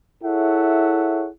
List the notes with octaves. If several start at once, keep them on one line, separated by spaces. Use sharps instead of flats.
E4 G#4 A4 C#5 E5 F#5